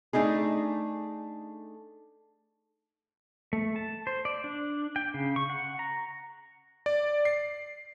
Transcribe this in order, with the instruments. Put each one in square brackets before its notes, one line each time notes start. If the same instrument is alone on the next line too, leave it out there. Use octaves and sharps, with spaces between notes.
[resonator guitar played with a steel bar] A3 D4 D#4 G#4
[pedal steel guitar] A3
A5
C5
D5
D4
G5
C#3
C#6
F#5
A#5
[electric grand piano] D5
C7